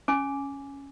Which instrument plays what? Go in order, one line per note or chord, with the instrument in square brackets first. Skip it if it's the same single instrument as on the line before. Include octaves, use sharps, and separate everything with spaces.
[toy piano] C#4 G#5 D6